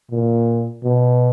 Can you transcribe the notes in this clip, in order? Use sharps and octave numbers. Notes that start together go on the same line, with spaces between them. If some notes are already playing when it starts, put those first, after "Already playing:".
A#2
B2